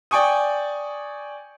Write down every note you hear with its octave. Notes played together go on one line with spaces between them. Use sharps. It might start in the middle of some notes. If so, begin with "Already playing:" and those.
D5 G5 G#5 C#6 D#6